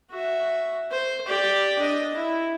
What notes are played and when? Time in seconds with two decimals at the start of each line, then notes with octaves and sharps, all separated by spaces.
0.10 F#4 E5
0.91 C5
1.27 G4 D5
1.79 D4 D#5
2.15 E4